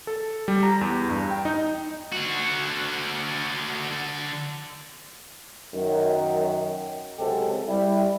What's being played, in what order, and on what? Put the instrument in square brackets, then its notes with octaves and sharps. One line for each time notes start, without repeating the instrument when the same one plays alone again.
[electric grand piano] A4
G3
A#5
E2
G2
G5
D#4
[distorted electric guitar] D3 F#4
[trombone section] F#2 D#3
C#2 C3 F#3 G#3 G4 A4
G3 E4